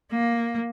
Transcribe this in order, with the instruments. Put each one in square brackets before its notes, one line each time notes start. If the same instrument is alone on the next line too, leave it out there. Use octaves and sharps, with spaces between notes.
[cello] A#3